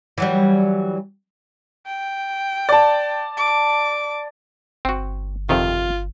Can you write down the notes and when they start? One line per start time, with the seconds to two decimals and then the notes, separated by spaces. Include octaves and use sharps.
0.18 E3 F#3 G3
1.87 G5
2.69 D5 A5
3.37 D6
4.85 G1 C4 F#4
5.49 F2 C3 D#3 F4